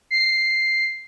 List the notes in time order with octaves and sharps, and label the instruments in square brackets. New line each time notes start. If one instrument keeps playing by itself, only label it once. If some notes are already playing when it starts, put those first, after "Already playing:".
[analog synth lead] C7